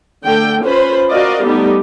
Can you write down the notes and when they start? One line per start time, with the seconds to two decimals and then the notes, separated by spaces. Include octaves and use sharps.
0.24 D3 A3 G5
0.64 C#4 F4 B4 C5 B5
1.10 F#4 A#4 D5 D#5 F5
1.44 G3 A3 B3 D#4 G4